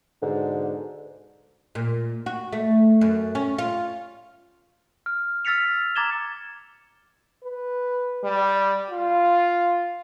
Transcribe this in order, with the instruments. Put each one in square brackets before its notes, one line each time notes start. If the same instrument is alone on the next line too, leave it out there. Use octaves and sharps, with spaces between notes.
[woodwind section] G#2 B2 D3
[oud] A#2
F#4
A3
F#2
C#4
F4
[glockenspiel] F6
E6 F6 A6 B6 C#7 F7
A#5 D6 G#6 A6 E7 G7
[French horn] B4
G3
F4